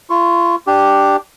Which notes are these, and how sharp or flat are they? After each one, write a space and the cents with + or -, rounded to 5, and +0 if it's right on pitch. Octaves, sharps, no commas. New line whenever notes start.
F4 -30 C#6 -20
D4 +5 G4 +0